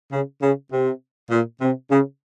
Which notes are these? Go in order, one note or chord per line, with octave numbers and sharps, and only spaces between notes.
C#3
C#3
C3
A#2
C3
C#3